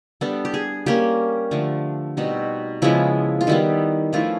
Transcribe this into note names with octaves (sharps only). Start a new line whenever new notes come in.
G3 B3 D4 A4
G4
G#4
G3 A#3 C#4 G4
D3 F3 A3
B2 G3 C4 D#4 F#4
C#3 F3 G#3 B3 E4
F4
D#3 G3 B3 E4
F3 A3 C#4 E4 F4